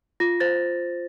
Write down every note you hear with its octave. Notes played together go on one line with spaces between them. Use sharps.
F4 A#6
C5 A6